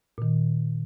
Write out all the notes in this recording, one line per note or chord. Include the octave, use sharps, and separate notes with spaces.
A#2 D#3